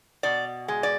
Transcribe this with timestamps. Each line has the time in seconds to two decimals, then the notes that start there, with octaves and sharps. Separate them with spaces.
0.23 B2 D5
0.68 G#3
0.83 D5